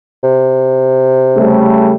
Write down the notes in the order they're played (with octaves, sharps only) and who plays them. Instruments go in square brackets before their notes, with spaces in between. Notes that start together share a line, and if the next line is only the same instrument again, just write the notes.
[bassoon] C3
[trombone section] C#3 G3 A3